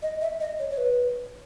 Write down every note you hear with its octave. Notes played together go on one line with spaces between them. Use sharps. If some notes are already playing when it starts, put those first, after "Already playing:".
D#5
E5
D#5
C#5
C#5
B4